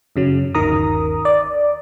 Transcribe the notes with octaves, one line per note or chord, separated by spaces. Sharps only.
F#2 C#3 F#3
G1 D#2 D#3 A#4 A#5 D#6
D5